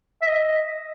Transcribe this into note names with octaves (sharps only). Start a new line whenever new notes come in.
E5
D#5